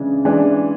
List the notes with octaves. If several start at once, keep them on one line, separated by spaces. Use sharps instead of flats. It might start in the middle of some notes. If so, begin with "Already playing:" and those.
Already playing: C#3 E3 G#3 D4
E3 G#3 D4